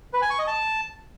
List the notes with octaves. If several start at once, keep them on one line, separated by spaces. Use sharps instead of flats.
B4
G#5
C#6
D#5
A5